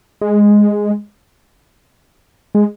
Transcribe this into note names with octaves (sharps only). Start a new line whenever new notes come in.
G#3
G#3